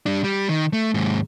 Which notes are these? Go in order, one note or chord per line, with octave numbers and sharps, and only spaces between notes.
G3 D4
G3
D#3
A3
D#2 G#2